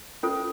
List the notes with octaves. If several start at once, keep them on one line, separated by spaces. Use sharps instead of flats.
C#4 F4 A4 C5